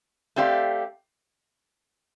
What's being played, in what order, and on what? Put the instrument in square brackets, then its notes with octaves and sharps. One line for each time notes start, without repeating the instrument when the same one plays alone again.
[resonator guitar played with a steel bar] A3 C4 G4 D5 F5